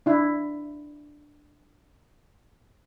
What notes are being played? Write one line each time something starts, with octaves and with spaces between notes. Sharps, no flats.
D4 E4